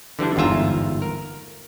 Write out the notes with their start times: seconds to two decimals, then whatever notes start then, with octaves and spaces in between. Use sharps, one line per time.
0.19 D3 E3 G3 D4
0.36 G1 E2 G#2 F4 E5 A#5
1.02 A#4